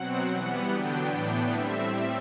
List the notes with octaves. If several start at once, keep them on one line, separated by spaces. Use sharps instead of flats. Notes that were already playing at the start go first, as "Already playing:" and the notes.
Already playing: B2 F#3 C4 F#5
E3 G3 B3
D3 F#3 B3 D4 G5
A2 E3 B3 D4 G5
A2 G3 C4 E5